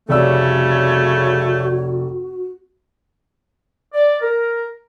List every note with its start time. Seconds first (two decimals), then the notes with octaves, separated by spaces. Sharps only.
0.09 F1 C#3 G3 A3 F#4 C#5 D5 E6
3.94 D5
4.22 A#4